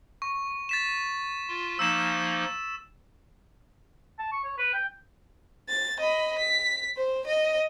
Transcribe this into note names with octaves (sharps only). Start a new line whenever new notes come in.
C#6
A6 B6 E7
F4
F3 A#3 D#4 E6 E7
A5
C#6
C#5
B4
G5
A6
D#5 B5
B6
C5
D#5